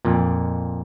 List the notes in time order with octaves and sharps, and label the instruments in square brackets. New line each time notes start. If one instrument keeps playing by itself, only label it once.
[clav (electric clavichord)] F2 A#2